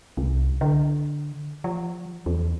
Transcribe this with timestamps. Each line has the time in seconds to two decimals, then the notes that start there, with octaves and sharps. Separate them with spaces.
0.17 C2
0.61 D3
1.64 F3
2.26 E2